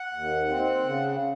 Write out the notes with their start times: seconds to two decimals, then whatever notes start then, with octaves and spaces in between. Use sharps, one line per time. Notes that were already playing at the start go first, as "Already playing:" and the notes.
Already playing: F#5
0.13 D#2
0.49 C4
0.84 C#3